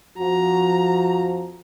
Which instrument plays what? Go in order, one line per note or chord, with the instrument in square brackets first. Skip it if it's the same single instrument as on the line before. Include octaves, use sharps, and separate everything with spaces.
[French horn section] F2 F3 [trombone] F#4 [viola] A#5